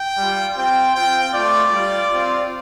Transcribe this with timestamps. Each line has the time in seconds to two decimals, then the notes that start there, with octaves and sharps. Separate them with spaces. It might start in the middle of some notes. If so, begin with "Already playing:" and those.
Already playing: G5
0.17 G3 F4
0.56 C4 F4 G5
0.94 C4 F4 G5
1.33 A3 F4 D5
1.71 G3 F4
2.11 C4 F4